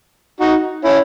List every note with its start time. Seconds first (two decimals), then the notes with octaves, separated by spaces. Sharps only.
0.40 D#4 F#4
0.85 C#4 E4